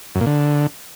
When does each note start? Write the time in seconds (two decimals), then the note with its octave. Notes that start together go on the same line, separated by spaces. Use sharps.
0.15 F#2
0.21 A#2
0.26 D3